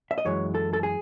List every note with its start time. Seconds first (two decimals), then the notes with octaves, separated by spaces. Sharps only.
0.11 E5
0.18 D#5
0.25 F#2 E3 G#3 C#5
0.55 A4
0.73 A4
0.83 G#4